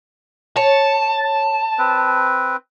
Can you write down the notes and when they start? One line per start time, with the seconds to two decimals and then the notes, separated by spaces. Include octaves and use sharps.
0.56 C#5 A5
1.78 C4 B4